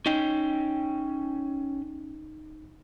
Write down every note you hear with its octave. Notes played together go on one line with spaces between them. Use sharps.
C#4 D#4 G5